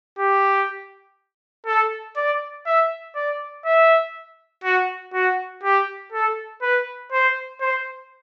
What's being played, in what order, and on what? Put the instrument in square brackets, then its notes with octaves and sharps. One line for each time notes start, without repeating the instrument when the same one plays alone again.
[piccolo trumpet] G4
A4
D5
E5
D5
E5
F#4
F#4
G4
A4
B4
C5
C5